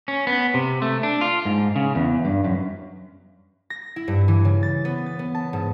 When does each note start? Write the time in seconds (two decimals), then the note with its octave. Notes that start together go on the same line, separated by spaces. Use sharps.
0.08 C#4
0.27 B3
0.54 C3
0.82 A3
1.03 D4
1.21 F4
1.45 G#2
1.76 C#3
1.95 E2
2.25 G2
2.45 F#2
3.70 A#6
3.96 E4
4.08 G2
4.28 E3
4.45 C#3
4.63 A6
4.85 B3
5.06 A6
5.19 B3
5.35 A5
5.53 G#2